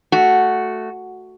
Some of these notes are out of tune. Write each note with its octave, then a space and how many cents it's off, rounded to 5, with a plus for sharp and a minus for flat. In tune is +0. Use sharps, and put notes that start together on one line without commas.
A3 +0 F#4 +0